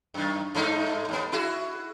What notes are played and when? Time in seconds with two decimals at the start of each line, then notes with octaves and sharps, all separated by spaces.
0.14 F#2 D#3
0.55 G2 A3 D#4
1.09 D#2 B3
1.32 E4 F#4 G#4